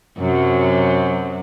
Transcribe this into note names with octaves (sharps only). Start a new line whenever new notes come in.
F#2 C3 F#3